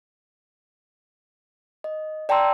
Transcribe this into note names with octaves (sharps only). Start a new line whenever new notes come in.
D#5
D5 G5 A5 A#5 C6 E6